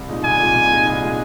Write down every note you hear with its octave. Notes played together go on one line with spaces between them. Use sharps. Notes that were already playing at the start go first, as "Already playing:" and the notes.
Already playing: C2
A#2 G#3 D#4
C2 G#5
A#2 G#3 D#4
C2
A#2 G#3 D#4
C2
A#2 G#3 D#4